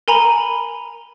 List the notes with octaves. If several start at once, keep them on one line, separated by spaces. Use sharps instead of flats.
A#4 G#5 A#5 B5